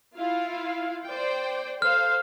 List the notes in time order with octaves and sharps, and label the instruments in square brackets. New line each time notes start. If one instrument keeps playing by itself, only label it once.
[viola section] E4 F4 F5
C5 D5 G5
[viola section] A4 C5 F5 [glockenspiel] F6